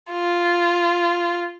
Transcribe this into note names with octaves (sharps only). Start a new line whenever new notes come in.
F4